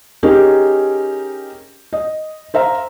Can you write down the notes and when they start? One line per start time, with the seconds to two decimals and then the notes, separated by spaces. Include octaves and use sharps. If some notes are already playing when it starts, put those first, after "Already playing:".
0.23 C#4 D#4 G4 G#4 A#4
1.93 D#5
2.54 C5 E5 F5 A#5